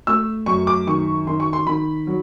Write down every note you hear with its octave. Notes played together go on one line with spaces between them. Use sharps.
A3 E6
F#2 C#6
D6
D#3 C#6
D#3 C6
C#6
C6
D#3 B5
F#3